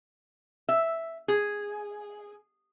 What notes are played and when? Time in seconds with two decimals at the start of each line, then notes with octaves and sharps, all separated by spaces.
0.69 E5
1.28 G#4